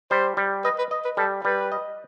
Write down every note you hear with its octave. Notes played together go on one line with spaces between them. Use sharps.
G3 C5
G3
B4 D#5
B4
D#5
B4
G3 A4
G3 B4
D#5